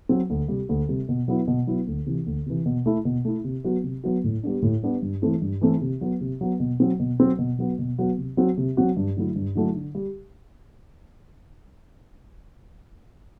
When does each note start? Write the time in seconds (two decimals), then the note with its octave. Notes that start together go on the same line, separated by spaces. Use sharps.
0.09 F#3 C4
0.30 D2
0.48 C3 G3
0.69 D2
0.89 C3 G3
1.09 B2
1.28 F#3 B3 E4
1.48 B2
1.67 F#3 B3 E4
1.87 D2
2.06 C3 E3
2.26 D2
2.46 C3 E3
2.66 B2
2.86 A3 E4
3.05 B2
3.25 A3 E4
3.44 C3
3.64 F#3 B3 F#4
3.83 C3
4.04 F#3 B3 F#4
4.24 A2
4.43 G3 B3 D4
4.62 A2
4.83 G3 B3 D4
5.02 G2
5.22 E3 A3 C4 E4
5.42 G2
5.61 E3 A3 C4 E4
5.81 C3
6.01 F#3 B3
6.21 C3
6.41 F#3 B3
6.60 B2
6.80 F#3 C4
6.99 B2
7.20 F#3 C4
7.39 B2
7.59 F#3 B3 F#4
7.79 B2
7.98 F#3 B3 F#4
8.18 C3
8.37 F#3 C4 F#4
8.58 C3
8.77 F#3 C4 F#4
8.97 G2
9.17 D3 F#3 A3 E4
9.36 G2
9.55 D3 F#3 A3 E4
9.76 D3
9.95 G3